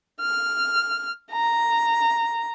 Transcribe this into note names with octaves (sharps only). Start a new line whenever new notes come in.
F6
A#5